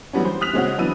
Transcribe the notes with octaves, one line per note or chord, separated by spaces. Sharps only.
E3 F#3 G3 B3 C#4
C5
D#6 F6 F#6 B6 F7
C#3 G#3 C4 C#4 F#4
E3 F#3 B3 D4 E6 D#7